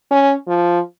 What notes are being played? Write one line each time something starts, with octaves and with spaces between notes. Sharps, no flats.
C#4
F3